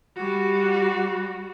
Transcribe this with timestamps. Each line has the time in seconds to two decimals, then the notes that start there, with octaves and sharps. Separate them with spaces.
0.17 G3 F#4